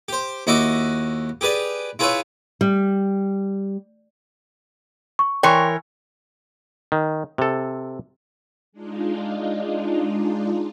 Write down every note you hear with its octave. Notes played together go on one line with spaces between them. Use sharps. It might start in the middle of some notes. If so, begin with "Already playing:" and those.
G4 C5
D#2 E4 F#4 D#5 E5 D6
G4 G#4 B4 D5
E4 F4 G#4 B4 C#5 E5
G3
C#6
E3 A#4 C#5 G5 C6 C#6
D#3
C3 A4
G#3 D4 D#4 F4